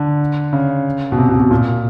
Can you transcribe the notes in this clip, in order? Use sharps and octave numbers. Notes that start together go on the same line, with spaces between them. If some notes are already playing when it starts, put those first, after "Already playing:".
Already playing: D3
C#3
B2
C3
B2
B2
A#2